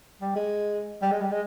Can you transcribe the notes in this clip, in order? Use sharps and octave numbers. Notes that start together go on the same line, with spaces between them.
G3
G#3
G3
G#3
G3
G#3